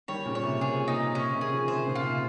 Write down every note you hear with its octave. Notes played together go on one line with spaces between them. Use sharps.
D#3 G3 C#5
A#2 C#3
C#5
C3
A#2 G#4
A#2 D#4
C3 C#4
C3 D#3
G#4
C#3 F3
C3 D#3 C5
A#2 C#3
F4
C3